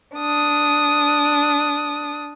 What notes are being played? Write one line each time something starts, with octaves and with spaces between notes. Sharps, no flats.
D4 D#6